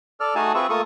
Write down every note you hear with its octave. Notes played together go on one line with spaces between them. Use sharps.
A4 D5 F6
A3 D#4 F#4 G#4 G#5 A5
C4 F4 G#4 B4 E5 C#6
A3 A#3 F4 A4 C#6 D#6